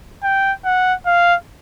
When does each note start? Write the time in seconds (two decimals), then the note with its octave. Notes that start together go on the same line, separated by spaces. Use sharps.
0.23 G5
0.65 F#5
1.06 F5